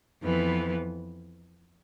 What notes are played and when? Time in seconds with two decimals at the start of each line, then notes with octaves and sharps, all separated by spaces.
0.22 F2 E3 B3